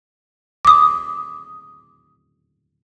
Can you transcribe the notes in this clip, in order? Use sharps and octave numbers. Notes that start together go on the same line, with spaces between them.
D6 D#6